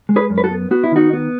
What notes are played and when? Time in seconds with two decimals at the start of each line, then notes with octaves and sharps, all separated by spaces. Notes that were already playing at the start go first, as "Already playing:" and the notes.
0.09 G#3
0.16 G#4 B4
0.30 F#2
0.38 B4
0.44 F#4 A4
0.50 B3
0.71 B3 F#4
0.84 E4
0.92 D#3 D#4 F#4
1.13 B3